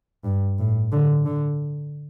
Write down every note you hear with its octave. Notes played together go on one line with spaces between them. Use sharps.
G2
A2
D3
D3